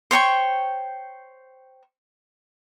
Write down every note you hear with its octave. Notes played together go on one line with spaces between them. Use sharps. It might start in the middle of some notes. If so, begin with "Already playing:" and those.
C5 C#5 G5 C#6